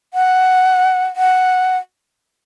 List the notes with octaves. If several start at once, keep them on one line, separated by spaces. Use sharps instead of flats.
F#5
F#5